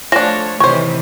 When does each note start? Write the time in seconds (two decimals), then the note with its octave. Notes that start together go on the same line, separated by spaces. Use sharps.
0.12 F3 A3 D4 C#5 A#6
0.60 C3 D#3 E3 C5 C#5 C#6